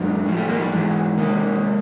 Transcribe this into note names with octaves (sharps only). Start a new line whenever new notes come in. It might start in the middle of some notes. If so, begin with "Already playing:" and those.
Already playing: F#2 D3 F#3 G#3
A2 F3
G3 A3
G#3 A#3
G3
G#2 E3 G#3
E2 C3 G#3 A#3